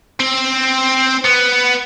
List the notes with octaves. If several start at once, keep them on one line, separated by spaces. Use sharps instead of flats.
C4
B3